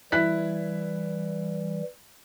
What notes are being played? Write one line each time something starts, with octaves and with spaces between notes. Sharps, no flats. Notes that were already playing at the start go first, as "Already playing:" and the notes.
E3 G3 E4 F#6 B6